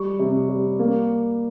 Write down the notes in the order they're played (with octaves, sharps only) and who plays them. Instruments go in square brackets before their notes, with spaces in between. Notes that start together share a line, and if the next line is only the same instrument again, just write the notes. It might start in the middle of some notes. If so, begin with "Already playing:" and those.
Already playing: [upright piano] G3 C#6
C3
G3
A#3